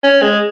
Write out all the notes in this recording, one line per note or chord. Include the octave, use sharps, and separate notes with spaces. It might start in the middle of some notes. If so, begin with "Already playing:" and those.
C#4
G#3